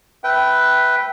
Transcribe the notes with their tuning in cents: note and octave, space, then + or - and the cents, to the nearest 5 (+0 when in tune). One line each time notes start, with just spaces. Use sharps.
B4 +0 E5 +0 G5 -20